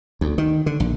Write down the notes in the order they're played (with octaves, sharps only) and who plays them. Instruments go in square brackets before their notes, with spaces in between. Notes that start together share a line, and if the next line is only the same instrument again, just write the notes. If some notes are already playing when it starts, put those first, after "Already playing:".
[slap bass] D2
D#3
D3
A#1